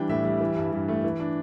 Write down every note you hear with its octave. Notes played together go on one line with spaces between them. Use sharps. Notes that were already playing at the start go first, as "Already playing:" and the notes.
Already playing: E3 G3 D4 G5
A2 E5
G3
E3
G2
G2
A3
E3
D4